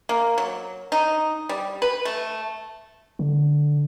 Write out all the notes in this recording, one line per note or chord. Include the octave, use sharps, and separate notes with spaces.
A#3
F#3
D#4
G3
B4
A3
D3